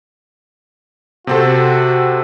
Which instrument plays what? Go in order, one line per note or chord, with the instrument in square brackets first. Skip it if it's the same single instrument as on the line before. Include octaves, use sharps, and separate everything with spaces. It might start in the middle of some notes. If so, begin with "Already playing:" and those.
[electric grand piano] C3 C4 A4 [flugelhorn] F#4